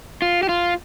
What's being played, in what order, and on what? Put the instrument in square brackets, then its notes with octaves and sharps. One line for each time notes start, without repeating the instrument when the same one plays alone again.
[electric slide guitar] F4
G4
F4